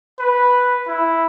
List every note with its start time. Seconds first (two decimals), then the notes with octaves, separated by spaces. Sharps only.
0.19 B4
0.87 E4